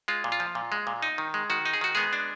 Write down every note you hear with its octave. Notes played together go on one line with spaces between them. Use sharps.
G#3 F4
A#2
F4
F3
A#2
G#3
A#2
D#4
D#3
G#3
D#3 F#4
D#4
G#4
D#3 F#4
G#3 B3 G#4
D4